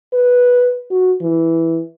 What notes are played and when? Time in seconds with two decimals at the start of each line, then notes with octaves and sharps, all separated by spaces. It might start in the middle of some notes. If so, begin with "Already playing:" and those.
0.13 B4
0.91 F#4
1.21 E3